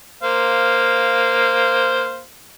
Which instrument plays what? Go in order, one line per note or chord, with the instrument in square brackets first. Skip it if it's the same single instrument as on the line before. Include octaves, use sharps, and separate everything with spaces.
[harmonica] A#3 C5 F5